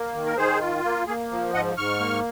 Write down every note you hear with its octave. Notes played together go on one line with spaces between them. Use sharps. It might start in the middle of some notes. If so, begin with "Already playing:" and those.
Already playing: A#3
D#3
A#4
D#3 G#4 C5
F4
A#3
A#3 G#4
F3
G#2 D#5 F#5
G#2 C#6 F6
A#3